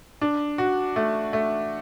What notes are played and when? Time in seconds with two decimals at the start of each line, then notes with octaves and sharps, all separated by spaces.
0.21 D4
0.58 F#4
0.96 A3
1.33 A3